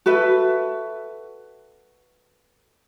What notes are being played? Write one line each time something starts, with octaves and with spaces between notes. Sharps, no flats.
F#4 A4 B4 E5